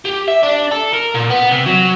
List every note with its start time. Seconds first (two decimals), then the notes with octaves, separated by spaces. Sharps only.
0.05 G4
0.28 E5
0.43 D4
0.71 A4
0.93 A#4
1.15 A#2
1.30 B3
1.52 C3
1.66 F#3